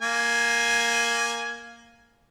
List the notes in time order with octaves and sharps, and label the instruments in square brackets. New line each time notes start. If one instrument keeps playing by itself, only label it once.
[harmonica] A#3 G#5